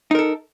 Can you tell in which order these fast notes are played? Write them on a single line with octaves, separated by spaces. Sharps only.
D#4 A#4 A4